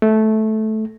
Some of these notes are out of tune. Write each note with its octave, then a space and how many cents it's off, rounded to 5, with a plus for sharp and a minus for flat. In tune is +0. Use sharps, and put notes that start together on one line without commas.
A3 -15